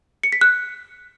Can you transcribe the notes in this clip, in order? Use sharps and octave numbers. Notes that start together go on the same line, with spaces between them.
C#7
B6
F#6